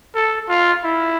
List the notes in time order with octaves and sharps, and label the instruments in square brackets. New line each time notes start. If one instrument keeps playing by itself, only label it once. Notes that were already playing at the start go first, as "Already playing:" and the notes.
[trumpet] A4
F4
E4